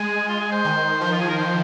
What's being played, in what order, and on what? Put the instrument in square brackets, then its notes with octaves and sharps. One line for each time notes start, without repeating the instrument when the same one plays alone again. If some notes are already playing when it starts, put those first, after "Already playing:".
Already playing: [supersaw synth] G#3 [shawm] G#4
[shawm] F4
G#4
C5
[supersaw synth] D#3
F3
[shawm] F4
G#4
A#4
C5